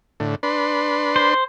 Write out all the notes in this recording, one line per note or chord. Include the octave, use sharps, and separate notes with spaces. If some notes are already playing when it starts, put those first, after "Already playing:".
A2 D3
D4 B4 C6
C5